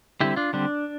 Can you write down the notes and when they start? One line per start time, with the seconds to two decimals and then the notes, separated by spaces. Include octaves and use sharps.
0.21 D3 G3 C4 E4 G4
0.36 D4 F4
0.53 D3 G3 C4 D4